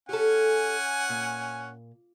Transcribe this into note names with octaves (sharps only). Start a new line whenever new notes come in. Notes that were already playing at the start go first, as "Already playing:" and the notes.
C#4 G4 A4 F#5 G#5
A#2